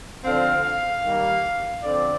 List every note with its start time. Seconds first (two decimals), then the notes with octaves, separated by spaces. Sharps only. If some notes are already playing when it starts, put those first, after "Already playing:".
0.24 D3 F3 C4 F5
0.64 F5
1.04 D#3 G3 A#3
1.83 D3 F3 C4 D5